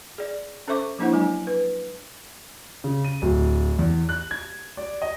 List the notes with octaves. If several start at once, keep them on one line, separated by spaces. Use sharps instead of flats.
G#4 D5
C#4 A4 C5 E5 C#6 D6
F3 A#3 D4 E4 C5 F#5
F#3 G#3 D4 G#5
B4
C#3
D#7
D1
E2
F#6
G#6
D5
D#5